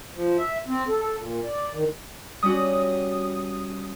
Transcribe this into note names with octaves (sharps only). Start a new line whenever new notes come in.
F3
E5
C4
A4
A4
A#2
D5
D#3
G3 C#4 F#4 D#6